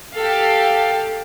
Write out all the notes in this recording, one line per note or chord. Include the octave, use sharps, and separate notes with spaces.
G4 A4 F5